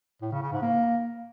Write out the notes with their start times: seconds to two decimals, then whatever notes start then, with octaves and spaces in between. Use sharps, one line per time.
0.22 A2
0.32 C#3
0.42 C#3
0.52 G#2
0.62 A#3